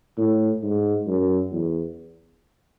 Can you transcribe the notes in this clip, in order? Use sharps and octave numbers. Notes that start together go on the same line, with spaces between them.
A2
G#2
F#2
E2